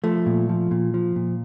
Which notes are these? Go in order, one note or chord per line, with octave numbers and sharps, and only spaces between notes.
F3 A3
A#2
F3
A#2
F3
A#2